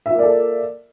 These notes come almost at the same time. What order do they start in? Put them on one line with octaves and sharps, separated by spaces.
E5 F4 A#3 D5 A4